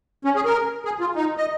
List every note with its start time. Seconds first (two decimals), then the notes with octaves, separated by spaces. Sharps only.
0.25 C#4
0.36 G#4
0.45 A#4
0.85 G#4
1.00 F4
1.16 D#4
1.37 D#5